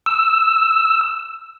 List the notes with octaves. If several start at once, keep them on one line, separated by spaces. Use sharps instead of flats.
E6